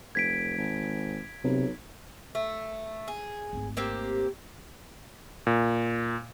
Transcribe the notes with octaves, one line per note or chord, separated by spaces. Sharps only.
F1 G#6 B6 D7
G#1
B1 C3
A3
G#4
G#1 A3
A#3 C4 G4
A#2